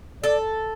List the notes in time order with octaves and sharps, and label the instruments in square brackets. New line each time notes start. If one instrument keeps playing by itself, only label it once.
[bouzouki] A4 [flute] D5